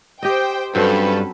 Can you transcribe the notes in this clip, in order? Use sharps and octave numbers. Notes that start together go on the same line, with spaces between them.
G4 C5 D#5 G5
G2 F#3 C4 C#4 A4 B4